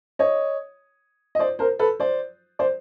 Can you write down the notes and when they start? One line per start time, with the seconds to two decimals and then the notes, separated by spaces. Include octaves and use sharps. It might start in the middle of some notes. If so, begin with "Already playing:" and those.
0.19 C#5 D#5
1.35 D#5
1.39 C5 D5
1.59 A#4 C5
1.79 A4 B4
2.00 C5 D5
2.59 C5 D5